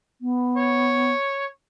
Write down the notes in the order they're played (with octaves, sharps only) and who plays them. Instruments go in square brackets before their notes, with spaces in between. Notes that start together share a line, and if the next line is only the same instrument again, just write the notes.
[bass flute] B3
[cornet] C#5